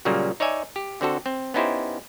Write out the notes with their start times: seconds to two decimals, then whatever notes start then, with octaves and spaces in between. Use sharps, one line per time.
0.05 A#2 C#3 F#3 G3 A#3
0.40 D#4 C#5 D5 E5 G#5
0.76 G4
1.01 D3 C4 F#4 A4
1.26 C4
1.54 B3 C#4 D#4 E4 G4 C5